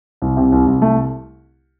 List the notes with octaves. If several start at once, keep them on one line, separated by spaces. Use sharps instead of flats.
C2
C3
C2
C2
A3